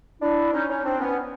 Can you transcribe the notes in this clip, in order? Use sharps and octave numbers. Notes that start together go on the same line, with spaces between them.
D4 E4
C#4 D#4
C#4 D#4
C4 D4
B3 C#4